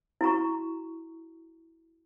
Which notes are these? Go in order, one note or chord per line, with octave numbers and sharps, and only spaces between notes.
E4 F#4 A#5 C#6